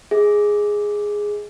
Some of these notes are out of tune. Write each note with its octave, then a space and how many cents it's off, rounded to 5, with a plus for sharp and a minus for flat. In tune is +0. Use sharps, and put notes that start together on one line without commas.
G#4 +0 D#5 +30